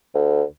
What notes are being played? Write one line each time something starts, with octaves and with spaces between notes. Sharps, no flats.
D2